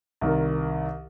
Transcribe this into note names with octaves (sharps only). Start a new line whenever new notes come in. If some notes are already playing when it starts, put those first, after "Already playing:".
C2 D#3 A#4